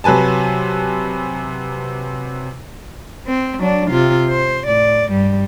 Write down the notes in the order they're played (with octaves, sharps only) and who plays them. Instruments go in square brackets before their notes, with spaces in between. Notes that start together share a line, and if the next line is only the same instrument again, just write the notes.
[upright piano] C3 F#3 B4 G#5 A5
[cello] C4
F#3 D4
C3 F4
C5
A2 D5
G2 G3